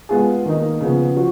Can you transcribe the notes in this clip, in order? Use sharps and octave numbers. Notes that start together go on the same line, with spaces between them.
G#3 B3 F4 G#4
D#3 A#3 D#4
C#3 F3 B3
F3 F#4